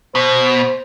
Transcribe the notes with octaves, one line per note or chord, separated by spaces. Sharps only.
B2 C5